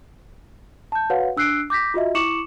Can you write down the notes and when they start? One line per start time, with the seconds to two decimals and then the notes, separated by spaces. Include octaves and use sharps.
0.92 A5 G6
1.10 F#4 B4 C#5 F5 F#5
1.37 D4 E6 F#6 C7 D7
1.70 D6 G6 A#6 B6
1.94 F4 F#4 D#5 E5
2.15 E4 C#6 D6 C#7 E7 F#7